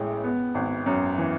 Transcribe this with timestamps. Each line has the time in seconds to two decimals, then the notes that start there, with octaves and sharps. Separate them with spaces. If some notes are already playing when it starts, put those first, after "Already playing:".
Already playing: A1 A2 G#3
0.24 B3
0.55 G#1
0.86 F#2
1.18 E3